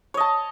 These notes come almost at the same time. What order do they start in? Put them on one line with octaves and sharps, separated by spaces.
C#5 D#5 A5